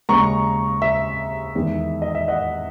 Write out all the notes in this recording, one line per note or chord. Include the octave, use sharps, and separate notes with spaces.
D#2 C#3 G#3 A#5 C#6
E5
E2 D#3 G#3
D#5
E5
D#5 F#5